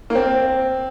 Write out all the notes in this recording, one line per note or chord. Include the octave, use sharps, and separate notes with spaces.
A#3
C4